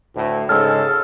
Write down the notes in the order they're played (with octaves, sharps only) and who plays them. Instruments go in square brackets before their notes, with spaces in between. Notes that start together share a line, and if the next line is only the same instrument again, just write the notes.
[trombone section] D2 A2
[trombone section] G#2 C#3 G#3 [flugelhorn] A4 [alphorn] C#5 [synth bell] E6 F6